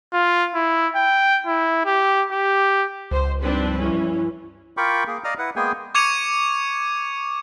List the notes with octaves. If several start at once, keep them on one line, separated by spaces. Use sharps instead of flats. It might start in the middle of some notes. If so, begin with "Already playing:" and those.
F4
E4
G5
E4
G4
G4
C#2 C5
G2 F3 G3 C4 D4 D#4 B4
E3 C#4 E4
F4 A#4 G5 B5 C#6 D6
A#3 G#4
D5 D#5 F5 A#5 D#6 F6
E4 B4 F#5
G#3 A#3 B3 G#4 G5 G#5
C#6 D6 G#6 C#7 D#7 F7